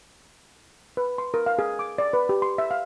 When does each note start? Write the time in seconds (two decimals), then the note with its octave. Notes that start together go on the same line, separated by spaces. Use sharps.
0.97 B4
1.18 C6
1.34 A#4
1.46 F5
1.59 G#4
1.79 D6
1.98 D5
2.13 B4
2.29 G4
2.42 C6
2.58 E5
2.71 F5